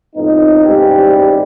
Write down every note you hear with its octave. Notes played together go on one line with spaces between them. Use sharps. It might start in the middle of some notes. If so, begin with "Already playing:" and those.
F2 A2 B3 D#4
A1 G#2 C3 G3 G#3 G4